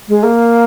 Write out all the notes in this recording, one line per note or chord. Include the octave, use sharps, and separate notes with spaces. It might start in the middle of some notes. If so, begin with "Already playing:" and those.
G#3
A#3